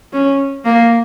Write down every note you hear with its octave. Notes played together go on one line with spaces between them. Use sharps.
C#4
A#3